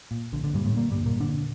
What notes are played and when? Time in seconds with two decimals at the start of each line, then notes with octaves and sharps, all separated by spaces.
0.11 A#2
0.33 A#1 D3
0.44 D3
0.54 G2 A#2 G3
0.65 A2 A3
0.76 A#2 D3 A#3
0.91 G2 G3
0.99 E1
1.06 A#2 A#3
1.20 A#2 D3 D4